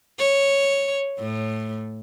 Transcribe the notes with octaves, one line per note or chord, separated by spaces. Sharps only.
C#5
A2